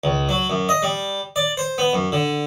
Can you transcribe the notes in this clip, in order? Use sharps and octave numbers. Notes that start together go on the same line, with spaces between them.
C#2
F#3
F#2
D#5
G3
D5
C5
B3
F#2
D3